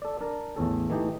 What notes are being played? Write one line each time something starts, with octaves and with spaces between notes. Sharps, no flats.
A4 D5
D4 A#4 A5
A1 E2 C#4 A4
E3 A3 D#4 G4